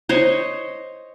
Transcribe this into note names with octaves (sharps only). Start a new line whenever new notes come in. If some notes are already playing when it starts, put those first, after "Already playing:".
C5 C#5 D#5